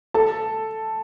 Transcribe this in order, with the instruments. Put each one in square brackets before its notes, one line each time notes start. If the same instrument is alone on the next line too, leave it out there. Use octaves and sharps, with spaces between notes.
[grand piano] A4 A5